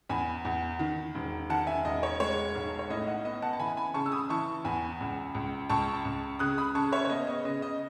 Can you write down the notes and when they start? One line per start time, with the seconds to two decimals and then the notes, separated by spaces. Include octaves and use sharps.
0.09 E2 G#5 B5
0.45 E2
0.79 D#3
1.15 E1
1.50 D#3 F#5 A5
1.67 E5 G#5
1.85 E1 D#5
2.03 C#5
2.20 G#3 C#5
2.55 B1
2.79 C#5
2.90 A2 D#5
3.07 D#5 F#5
3.25 B3 D#5
3.42 F#5 A5
3.53 A5
3.59 E3 G#5 B5
3.77 G#5 B5
3.94 C#3 A5 C#6
4.06 E6
4.12 B5 D#6
4.29 E3 A5 C#6
4.65 E2 G#5 B5
5.01 C#2
5.35 C#2
5.70 C#2 A5 C#6
6.05 C#2
6.39 C#3 D#6 F#6
6.58 B5 D#6
6.75 C#3 A5 C#6
6.92 C#5 E5
7.05 C#5
7.10 B3 D#5
7.27 D#5
7.45 C#3 D#5
7.62 D#5